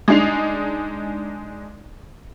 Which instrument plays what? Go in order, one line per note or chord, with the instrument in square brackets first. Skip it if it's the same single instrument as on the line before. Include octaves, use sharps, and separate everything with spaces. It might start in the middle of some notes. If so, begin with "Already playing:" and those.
[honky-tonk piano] G#3 D4 D#4 C7 F7